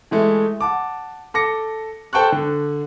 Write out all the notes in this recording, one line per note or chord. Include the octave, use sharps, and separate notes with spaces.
E3 G#3 A3
F#5 A5 D6
A4 D6 A#6 C#7
A4 C5 G5 A5 C#6 F#6
D3